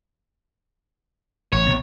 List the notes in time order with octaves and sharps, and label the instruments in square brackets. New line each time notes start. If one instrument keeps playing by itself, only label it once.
[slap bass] A1 [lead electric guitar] C#5
[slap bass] A#1 C3 B3